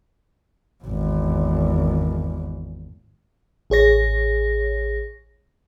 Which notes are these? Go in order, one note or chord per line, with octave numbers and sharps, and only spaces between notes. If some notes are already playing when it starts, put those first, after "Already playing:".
G#1 E2
A1 G#4 C#5 A#6